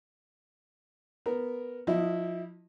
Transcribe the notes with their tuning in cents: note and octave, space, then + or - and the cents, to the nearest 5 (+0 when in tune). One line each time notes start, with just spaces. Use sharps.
B3 +0 A#4 +0
F3 +25 E4 -10 D#5 +0